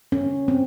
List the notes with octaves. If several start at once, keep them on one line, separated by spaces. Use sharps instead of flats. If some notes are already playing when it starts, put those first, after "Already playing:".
C#4
C4